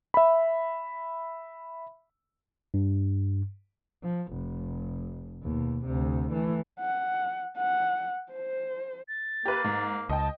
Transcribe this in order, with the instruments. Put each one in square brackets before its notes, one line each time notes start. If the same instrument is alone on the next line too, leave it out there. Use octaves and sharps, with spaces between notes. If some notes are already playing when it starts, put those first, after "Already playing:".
[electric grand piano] E5 B5
[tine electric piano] G2
[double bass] F3
F1
D#2 B2
D2 C3
E3 A3
[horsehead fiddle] F#5
F#5
C5
[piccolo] A6
[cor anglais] A#3 [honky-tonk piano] G4 B4
[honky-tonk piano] G#2
[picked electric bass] C#2 [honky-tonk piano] D#5 G5 [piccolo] A5